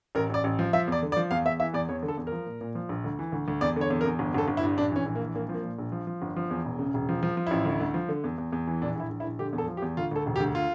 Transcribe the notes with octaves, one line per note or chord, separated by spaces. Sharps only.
A1 A#4
A1 D5
A1
F3
F3 E5
E2 D5
D3
D5
F3
E2 F5
E2 E5
E3 E5
E2 D5
E2 C#5
D3
A4
E2
A#4
F3
A#2
A#2
F3
A#1
D2
E3
D2
D2
E2 D5
D3
C#5
E2
A#4
E2
G1
G1 A4
G1
E4
G2
A#1 D4
E3 C#4
A#1
A#3
E3
A#1 A#3
F3
A#3
A#2
A#1
F3
F3
G1
F3
E2
E1
C#3
E1
F3
F3
F3
A1 E4
D2
D2
F3
D3
E2
E2
E2
E3
A#1 D4
A#1 E4
A#1
E4
A#1
D3 G4
E2
A4
F3
G4
E2
D2 F4
D2 A4
E1
G4
D2
F4